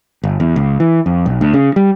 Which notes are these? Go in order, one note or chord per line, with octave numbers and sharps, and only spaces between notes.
G1
E2
C#2
E3
F2
B1
D2
C#3
G3